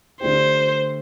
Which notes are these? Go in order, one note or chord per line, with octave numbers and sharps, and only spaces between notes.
D3 A3 D4 G4 C5